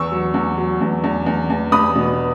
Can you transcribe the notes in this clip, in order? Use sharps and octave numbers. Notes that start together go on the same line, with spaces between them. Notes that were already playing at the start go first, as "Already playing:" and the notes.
Already playing: E2 C#6 E6
F#3
E2
F#3
E2
E2
E2
E2
E2 B5 D#6
B2